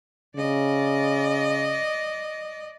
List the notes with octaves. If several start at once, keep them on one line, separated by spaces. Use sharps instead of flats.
C#3 D5 D#5